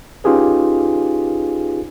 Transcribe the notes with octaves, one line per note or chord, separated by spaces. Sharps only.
C#4 D#4 F4 G4 G#4 B4